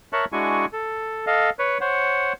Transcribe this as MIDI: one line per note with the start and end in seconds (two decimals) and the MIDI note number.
0.13 0.25 70
0.13 0.25 73
0.13 0.25 76
0.13 0.25 81
0.13 0.25 85
0.13 0.25 90
0.32 0.66 56
0.32 0.66 62
0.32 0.66 64
0.32 0.66 66
0.32 0.66 80
0.32 0.66 85
0.73 1.26 69
1.27 1.50 69
1.27 1.50 75
1.27 1.50 77
1.59 1.78 71
1.59 1.78 73
1.81 2.33 72
1.81 2.33 73
1.81 2.33 78